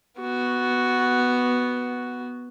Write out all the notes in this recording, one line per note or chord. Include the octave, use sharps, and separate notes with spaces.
B3 F#4